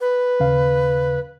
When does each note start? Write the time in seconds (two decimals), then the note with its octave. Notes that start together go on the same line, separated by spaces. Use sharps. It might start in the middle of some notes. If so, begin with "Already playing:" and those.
0.01 B4
0.40 D#2 C#3 F5